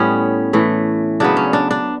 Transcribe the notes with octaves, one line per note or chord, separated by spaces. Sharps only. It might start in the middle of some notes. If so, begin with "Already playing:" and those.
Already playing: A2 G3 B3 C#4
A2 E3 A3
C#3 F#3 B3 D4
C#4
D4
D4